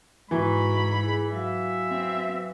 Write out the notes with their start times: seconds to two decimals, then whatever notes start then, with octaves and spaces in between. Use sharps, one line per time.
0.31 G#2 E3 F#4 A#5 B5 C#6
1.00 E4 G#4
1.32 F#3 F#4 E5 F5
1.89 C4